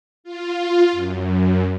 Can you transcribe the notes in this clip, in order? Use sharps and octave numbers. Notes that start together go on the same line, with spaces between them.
F4
F#2